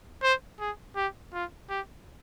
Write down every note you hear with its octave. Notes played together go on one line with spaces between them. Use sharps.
C5
G#4
G4
F4
G4